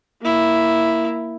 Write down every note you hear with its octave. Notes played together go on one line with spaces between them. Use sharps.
A#3 E4